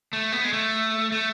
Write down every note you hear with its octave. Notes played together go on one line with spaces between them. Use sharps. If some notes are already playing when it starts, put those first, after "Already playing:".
A3
B3
G#3
A3
A3